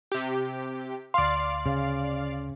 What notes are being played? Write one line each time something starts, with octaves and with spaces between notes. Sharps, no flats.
C3 G4
D2 D5 F5 C6
C#3